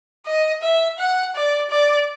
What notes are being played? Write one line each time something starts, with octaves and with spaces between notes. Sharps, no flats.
D#5
E5
F#5
D5
D5